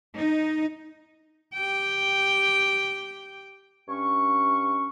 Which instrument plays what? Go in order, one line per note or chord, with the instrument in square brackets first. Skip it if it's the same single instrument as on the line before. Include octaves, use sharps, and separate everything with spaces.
[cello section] D#4
[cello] G4 G5
[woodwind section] G2 C#4 C#6